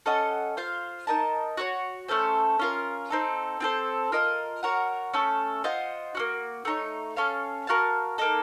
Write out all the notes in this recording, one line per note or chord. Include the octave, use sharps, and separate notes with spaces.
C#4 A4 D#5 F#5
F4 C5 F5
D#4 A#4 D#5 A5
F#4 A4 C#5
A3 C#4 A4 C5
C#4 F4 A#4
C4 D#4 A4
C4 F4 A4 C5
F4 A#4 D#5 A5
F#4 A#4 C#5 F#5
A3 C#4 A4
F4 C5 D#5 F#5
A#3 C#4 F#4
A3 D#4 A4 C#5
C#4 A4 C#5 F5
F#4 A#4 F5 A5
A#3 D#4 A4